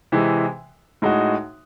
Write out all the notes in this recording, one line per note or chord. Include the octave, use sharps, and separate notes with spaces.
C3 E3 G#3
A2 G#3 D#4 F#4